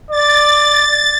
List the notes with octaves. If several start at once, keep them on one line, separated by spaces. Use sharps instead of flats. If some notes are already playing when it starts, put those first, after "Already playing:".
D5 A6